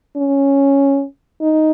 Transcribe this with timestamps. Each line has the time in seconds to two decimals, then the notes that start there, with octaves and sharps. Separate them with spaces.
0.17 C#4
1.41 D#4